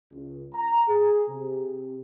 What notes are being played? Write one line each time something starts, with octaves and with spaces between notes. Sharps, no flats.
C#2
A#5
G#4
C3